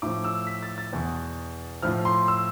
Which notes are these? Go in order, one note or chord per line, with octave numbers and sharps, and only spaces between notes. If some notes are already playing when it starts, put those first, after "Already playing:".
A2 F3 D6
E6
B6
A6
A6
E2 B2
A2 F3 F6
C6
E6